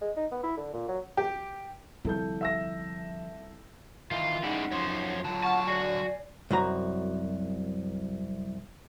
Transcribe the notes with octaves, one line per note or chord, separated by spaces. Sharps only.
G#3
D#4
B3
E4
D3
A#2
F#3
G4
C2 D3 F3 A4 G6
E5 E6 A#6
D#3 E3 F4
G#3 C#4 D#4 E4 G4 D5 F#5
F#2 F3 C#5 C6
D3 F#3 F4 A5
F#5 A5 C#6 F6
F#4 D5 G#5 C7
C2 F#2 F#4 A#5